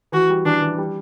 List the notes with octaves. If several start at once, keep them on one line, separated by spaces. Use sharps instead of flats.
E3 F#4
G3
E3 D4
E3
G3